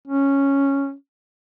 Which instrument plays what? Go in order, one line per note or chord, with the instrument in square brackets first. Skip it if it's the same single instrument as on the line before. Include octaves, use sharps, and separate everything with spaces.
[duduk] C#4